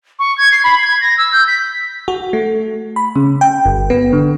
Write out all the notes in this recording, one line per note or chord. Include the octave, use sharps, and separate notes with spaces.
C#6
G#6
C7
B5
G#6
A#6
E6
G6
B6
F#4
A3
B5
C#3
G5
G1
B3
D3